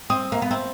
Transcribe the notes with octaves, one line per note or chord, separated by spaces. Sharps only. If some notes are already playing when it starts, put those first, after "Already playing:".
C4 D#6
A#3
B3
C4